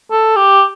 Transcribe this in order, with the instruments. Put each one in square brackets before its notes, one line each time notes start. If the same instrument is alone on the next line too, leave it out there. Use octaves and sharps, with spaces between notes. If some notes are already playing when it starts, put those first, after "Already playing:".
[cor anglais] A4
G4